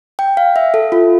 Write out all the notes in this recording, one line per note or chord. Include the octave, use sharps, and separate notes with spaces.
G5
F5
E5
A4
F4